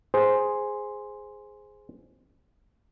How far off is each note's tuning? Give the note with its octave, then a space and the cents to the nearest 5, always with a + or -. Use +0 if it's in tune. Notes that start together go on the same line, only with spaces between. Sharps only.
G#4 +0 C5 +0